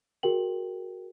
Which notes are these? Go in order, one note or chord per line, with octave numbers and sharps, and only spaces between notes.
F#4 G#4 A#4 G5 F#7